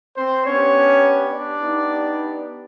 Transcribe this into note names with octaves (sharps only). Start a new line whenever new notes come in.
C4 C5
B3 C#4 D4 G4 C#5
D4 D5
B3 D#4 G4